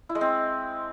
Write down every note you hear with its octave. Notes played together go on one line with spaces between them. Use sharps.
E4
G#3
C4